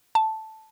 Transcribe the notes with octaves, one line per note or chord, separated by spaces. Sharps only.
A5